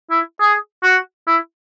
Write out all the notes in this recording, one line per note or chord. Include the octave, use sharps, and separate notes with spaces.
E4
G#4
F#4
E4